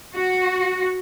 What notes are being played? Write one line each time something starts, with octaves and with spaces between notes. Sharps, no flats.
F#4